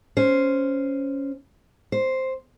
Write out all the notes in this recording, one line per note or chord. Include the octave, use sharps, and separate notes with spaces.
C#4 C5
C5